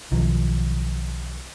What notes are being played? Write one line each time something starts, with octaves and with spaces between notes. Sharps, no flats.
B1 D#3 F3